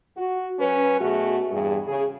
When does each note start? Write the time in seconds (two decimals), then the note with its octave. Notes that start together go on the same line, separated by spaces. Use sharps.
0.17 F#4
0.59 F#3 C#4 B4
1.01 B2 A3 F#4 G#4
1.50 E2 G2 G3 G#4
1.87 C#3 G#4